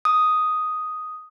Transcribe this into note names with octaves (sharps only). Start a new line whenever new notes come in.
D#6